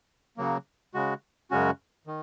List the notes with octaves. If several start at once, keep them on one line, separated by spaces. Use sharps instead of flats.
C#3 F#3 A#3
C#3 G#3 F#4
F#2 C#3 G#3 C#4 F#4
D#3